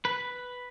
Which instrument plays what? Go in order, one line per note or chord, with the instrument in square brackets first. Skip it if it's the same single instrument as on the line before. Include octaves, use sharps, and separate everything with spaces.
[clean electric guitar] B4